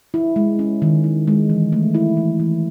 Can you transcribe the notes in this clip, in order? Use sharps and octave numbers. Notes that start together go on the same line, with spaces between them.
E4
G#3
C#4
D#3
E4
G#3
E3
A3
E4
E3
E3